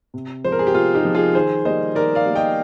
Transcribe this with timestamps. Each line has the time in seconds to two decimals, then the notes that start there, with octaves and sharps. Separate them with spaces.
0.14 C3
0.44 F3 G#3 C5
0.52 A#4
0.59 G#4
0.67 G4
0.74 C3 F4
0.95 D#4 G4
1.05 F3 G#3
1.15 F4 G#4
1.35 D#3 G#4 C5
1.65 G3 A#3 C5 D#5
1.95 D#3 A#4 D5
2.15 D5 F5
2.26 G3 A#3
2.36 D#5 G5